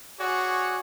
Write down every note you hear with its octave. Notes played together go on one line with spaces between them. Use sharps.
F#4 G#4 C#5 D5 F#5 G#5